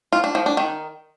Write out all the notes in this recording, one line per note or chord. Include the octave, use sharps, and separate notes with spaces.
F4
D4
F3
D4
D#3